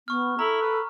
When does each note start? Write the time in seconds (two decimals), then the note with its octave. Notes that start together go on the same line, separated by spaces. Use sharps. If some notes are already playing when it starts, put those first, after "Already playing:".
0.08 B3 C#6 F6
0.39 E4 A4 A#5
0.62 B4